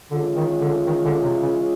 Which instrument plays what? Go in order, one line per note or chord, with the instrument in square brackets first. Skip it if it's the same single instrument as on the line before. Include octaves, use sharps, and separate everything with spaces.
[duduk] D3 [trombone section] E3 G#3 C#4 F4
[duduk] D#3
D3
D#3
D3
C3
C#3